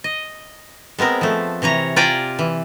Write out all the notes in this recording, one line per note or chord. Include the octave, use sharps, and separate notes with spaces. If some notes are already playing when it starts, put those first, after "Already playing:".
D#5
G#3 B3 C4 A#4
F3 A3
C3 E3 C#5 A#5
F4 G4 D5 G5 G#5 A#5
E3